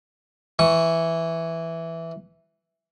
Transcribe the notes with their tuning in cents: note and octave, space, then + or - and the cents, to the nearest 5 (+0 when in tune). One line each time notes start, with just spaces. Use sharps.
E3 +0 C#6 +0